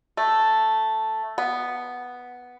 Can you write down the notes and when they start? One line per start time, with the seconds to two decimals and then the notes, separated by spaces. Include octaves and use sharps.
0.17 A3
1.38 B3